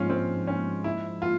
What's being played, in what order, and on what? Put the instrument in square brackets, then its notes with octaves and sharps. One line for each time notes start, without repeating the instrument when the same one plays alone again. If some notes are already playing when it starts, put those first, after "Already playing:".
Already playing: [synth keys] G#2 F3 G#3 [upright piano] C#4 F4
[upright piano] C4
C#4
E4
F4